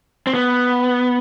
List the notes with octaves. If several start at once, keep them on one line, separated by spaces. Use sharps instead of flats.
C4
B3